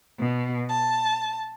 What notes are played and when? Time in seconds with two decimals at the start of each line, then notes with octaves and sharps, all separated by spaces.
0.18 B2
0.69 A5